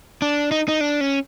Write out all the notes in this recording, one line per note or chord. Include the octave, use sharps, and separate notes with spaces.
D4
D#4
D#4
D4
C#4